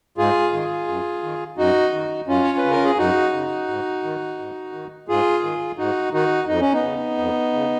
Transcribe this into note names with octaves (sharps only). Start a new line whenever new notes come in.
G#2 F4 G#4
D#3
F#2
D#3
F#2 D#4 F#4
D#3
F#2 C#4 F4
C#5
B4
C#3
A#4
G#4
F#2 D#4 F#4
C#3
G#2
D#3
G#2
D#3
G#2 F4 G#4
D#3
G#2 D#4 F#4
D#3 D#4 F#4
F2 D#4
C#4
B3 D#4
C#3
F2
C#3